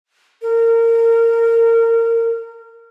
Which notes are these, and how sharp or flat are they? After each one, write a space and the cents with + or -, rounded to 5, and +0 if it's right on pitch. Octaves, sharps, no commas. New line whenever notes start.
A#4 -25